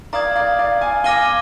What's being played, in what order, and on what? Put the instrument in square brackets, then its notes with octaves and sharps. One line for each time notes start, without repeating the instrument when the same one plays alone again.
[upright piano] D5 F5 [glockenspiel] A#5 D#6 G#6
[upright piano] D5 F5
D5 F5
F5 G#5
[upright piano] F5 G#5 [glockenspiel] D6 F6 A#6 D#7 G7